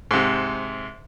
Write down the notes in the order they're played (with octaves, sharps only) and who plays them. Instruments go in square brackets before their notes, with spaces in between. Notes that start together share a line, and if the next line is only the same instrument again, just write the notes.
[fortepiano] G#2 C3